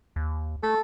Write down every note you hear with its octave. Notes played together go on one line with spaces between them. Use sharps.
D#2
A3 A4